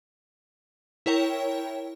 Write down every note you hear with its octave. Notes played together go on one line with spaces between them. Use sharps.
E4 A#4 C#5 G5